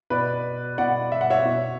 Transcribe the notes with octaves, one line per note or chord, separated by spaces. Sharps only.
B2 B4 D5
B2 D5 F#5
E5
F#5
C#5 E5
B2